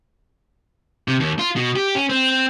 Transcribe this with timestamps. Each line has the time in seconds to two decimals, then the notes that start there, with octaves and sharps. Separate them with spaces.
1.08 C3
1.20 D#2
1.39 F4
1.56 B2
1.76 G4
1.95 C#4
2.10 C4